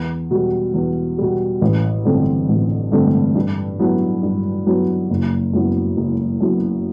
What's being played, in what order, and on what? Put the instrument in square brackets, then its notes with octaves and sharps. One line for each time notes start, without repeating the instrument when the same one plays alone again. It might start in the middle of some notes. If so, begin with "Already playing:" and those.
Already playing: [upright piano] E2
B2 G3
E2
B2 G3
A1
G2 D3 A3 C4
A1
G2 D3 A3 C4
G2
F#3 B3 E4
G2
F#3 B3 E4
F#1
F#2 F#3 B3 E4
F#1
F#2 F#3 B3 E4